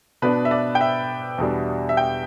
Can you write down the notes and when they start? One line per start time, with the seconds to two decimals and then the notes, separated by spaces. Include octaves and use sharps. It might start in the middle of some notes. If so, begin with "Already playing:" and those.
0.22 B2 B3 D4 B4
0.45 E5
0.51 D5
0.75 G5
0.81 E5
1.38 E2 B2 G3 D4
1.89 E5
1.97 G5